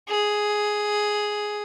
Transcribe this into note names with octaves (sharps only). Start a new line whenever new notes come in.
G#4